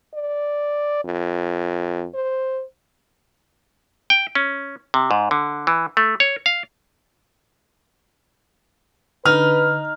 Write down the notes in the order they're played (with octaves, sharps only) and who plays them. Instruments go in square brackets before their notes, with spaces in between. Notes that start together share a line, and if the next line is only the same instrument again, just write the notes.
[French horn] D5
F2
C5
[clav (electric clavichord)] G5
C#4
C3
G#2
D3
E3
A3
C#5
F5
[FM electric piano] D3 [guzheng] D#4 [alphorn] B4 [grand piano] F6